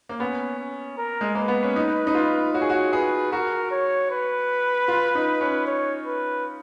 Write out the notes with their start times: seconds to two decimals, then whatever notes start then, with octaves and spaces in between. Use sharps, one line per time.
0.09 A#3
0.20 B3 C#4
0.59 C#4
0.98 A#4
1.21 G#3
1.35 A#3 B4
1.48 B3
1.63 C#4
1.76 D#4
2.07 D#4
2.15 F4
2.54 F#4 C#5
2.62 G#4
2.70 F#4
2.93 G#4 B4
3.32 F#4 A#4
3.71 C#5
4.11 B4
4.88 F4
5.15 D#4
5.41 C#4
5.67 C#5
6.06 B4